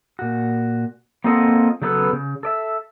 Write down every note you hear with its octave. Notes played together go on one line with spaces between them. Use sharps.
A#2 F#4
A#3 C4 F4 A4 D#5 F#5
C#3 F#3 A3 B3 A4 B4
C#3
A4 D5 E5